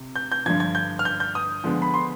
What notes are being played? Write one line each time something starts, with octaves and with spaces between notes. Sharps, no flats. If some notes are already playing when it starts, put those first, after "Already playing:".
Already playing: C3
G6
G6
G2 D3 F3 G#6
G#6
G6
F6
G6
G6
D#6
D3 F3 G#3 B3
B5
C6